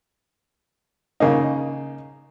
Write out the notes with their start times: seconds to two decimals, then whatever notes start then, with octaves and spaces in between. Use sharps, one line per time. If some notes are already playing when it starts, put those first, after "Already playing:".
1.20 C#3 A#3 D#4